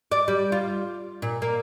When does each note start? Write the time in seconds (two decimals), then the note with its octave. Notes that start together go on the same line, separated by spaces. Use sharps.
0.12 D5
0.28 G3
0.52 F4
1.22 A#2
1.42 A#3